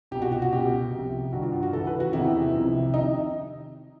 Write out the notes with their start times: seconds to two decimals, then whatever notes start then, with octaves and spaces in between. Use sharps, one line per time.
0.11 C2 B2 G4
0.22 F#4
0.32 F#4
0.42 F#4
0.52 C#2 B2 G4
0.92 C2 C3 F3
1.33 G2 D#3 F#4
1.42 F4
1.53 F4
1.63 F#4
1.73 C#2 C#3 E3 A4
1.87 B4
2.00 F#4
2.13 E2 C3 D#3 E4
2.54 C2 C3 F3
2.94 C3 D#3 D#4